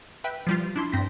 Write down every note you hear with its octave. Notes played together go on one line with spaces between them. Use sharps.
B4 E5 G5
F3 G3 F4
D4 E4 C6
G2 C4 A#6 B6